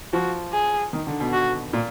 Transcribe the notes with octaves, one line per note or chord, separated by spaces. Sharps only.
F3 F#4
G#4
D#3
D3
B2
F#4
A#2